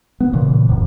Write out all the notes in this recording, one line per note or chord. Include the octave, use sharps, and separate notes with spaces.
B3
A#2 C#3 E3
D1 F#2